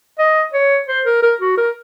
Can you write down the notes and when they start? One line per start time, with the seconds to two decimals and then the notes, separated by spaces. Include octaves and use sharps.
0.19 D#5
0.53 C#5
0.88 C5
1.06 A#4
1.22 A#4
1.41 F#4
1.58 A#4